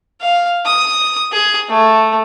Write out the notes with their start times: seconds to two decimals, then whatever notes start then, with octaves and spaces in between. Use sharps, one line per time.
0.21 F5
0.66 D#6
1.32 G#4
1.69 A3